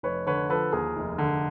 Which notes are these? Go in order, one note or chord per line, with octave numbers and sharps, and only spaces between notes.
F1 B4 C#5
D3 B4 C#5
F3 A4 B4
D#2 G#4 A#4
F1
D3